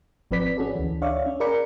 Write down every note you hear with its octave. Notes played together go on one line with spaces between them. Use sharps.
G#1 F3 C4 B4 D5 B6
C#4 F#4 G#4 A4 D5
D2 E3
D4 C#5 D5 E5 F5 C#6
C#4
G#4 A#4 D5 B5 C#7